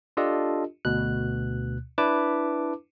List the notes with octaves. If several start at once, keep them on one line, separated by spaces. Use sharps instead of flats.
D4 F4 G4 A4 D#5
D2 B2 F#6
D4 E4 B4 A5 D6